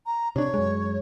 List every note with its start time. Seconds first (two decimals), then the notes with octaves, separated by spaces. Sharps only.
0.06 A#5
0.36 C3 D4 C#5
0.54 F#2 G#3